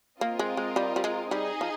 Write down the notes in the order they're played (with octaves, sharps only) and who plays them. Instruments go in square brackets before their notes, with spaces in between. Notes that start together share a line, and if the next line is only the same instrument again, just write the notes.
[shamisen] A#3 [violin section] C4 F4 A#4 D#5
[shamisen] G#3
G#3
G3
G3
G#3
[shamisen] G3 [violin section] D#4 G#4 D#5
[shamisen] F3